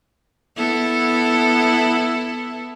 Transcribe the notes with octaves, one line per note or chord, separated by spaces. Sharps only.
B3 E4 A4